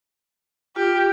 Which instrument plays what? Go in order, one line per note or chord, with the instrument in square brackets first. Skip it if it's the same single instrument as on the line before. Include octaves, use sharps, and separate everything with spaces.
[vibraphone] F4 [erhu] G4